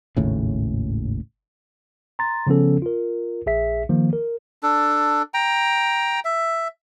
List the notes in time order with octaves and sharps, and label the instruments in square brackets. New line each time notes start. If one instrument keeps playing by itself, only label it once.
[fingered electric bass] G#1 D#2 A2 C#3
[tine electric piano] A#5 C6 A6
C#3 F3 B3 C#4 A4
F4 A#4
A#1 G#4 E5 B6
D#3 F3 A#3
A#4
[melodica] D4 A4
G5 A#5
E5